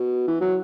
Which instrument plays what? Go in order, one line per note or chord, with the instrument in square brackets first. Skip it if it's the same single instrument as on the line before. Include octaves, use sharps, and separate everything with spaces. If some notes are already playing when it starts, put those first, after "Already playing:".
Already playing: [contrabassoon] B2
E3
F#3